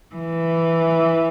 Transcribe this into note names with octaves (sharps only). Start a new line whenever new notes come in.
E3